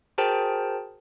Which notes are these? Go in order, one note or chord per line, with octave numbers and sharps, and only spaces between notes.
F#4 G#4 A#4 C5 G5 A5